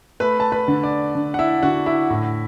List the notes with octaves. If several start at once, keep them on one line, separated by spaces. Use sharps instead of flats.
A3 B4 B5
A5
B4 B5
D3
D5
D3
F#5
E4 E5
D3 F#4 F#5
E4 E5
A2